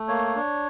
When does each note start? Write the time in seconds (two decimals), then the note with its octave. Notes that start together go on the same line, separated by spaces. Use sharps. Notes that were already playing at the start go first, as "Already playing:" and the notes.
Already playing: A3
0.08 A#3 C#5
0.36 D4